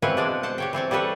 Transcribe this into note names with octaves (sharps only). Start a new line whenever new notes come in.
B2 E3 C4 B4 C#5 F5
G#3 D4 D5
C5 F#5 A5
G4 C#5 G5
E3 C4 C#5 D5
G3 G#4 A4 B4 C#5